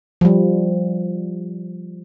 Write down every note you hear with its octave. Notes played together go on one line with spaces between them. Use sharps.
F3 G3